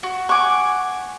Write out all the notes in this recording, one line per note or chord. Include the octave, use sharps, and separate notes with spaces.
F#4
F#5 G#5 C#6 D6